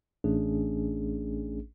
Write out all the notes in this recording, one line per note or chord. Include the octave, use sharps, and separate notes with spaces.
A1 A3 C#4 D4 G#4